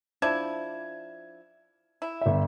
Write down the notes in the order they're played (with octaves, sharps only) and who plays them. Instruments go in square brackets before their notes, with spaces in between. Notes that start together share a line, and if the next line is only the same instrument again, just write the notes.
[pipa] F3 D4 E4 [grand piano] G#6
[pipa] E4
[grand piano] G1 E5